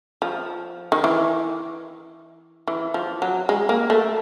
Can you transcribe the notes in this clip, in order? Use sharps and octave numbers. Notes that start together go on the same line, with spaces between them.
F3
D#3
E3
E3
F3
F#3
G#3
A#3
A3